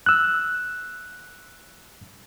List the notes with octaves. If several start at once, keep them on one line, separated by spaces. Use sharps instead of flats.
E6 F#6